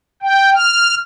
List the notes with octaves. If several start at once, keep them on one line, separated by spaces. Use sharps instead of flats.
G5
F6